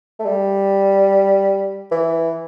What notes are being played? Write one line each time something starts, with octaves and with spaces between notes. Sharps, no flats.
A3
G3
E3